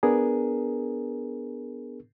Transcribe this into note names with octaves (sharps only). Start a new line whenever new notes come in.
B3 D4 G#4 A#4